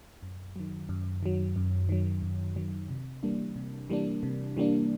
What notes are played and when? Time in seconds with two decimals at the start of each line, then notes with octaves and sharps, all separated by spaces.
0.23 F#2
0.56 D#3 F#3
0.89 F#2
1.23 D#3 F#3
1.56 F#2
1.89 D#3 F#3
2.22 F#2
2.56 D#3 F#3
2.89 C3
3.23 E3 G3 A#3 D4
3.56 C3
3.90 E3 G3 A#3 D4
4.23 C3
4.57 E3 G3 A#3 D4